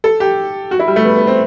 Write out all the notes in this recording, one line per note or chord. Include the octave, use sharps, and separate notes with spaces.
A4
G4
F#4
E4
G3
A3
B3
B3
C4